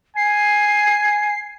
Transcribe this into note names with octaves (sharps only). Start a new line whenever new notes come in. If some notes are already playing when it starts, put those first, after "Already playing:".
G#5 C7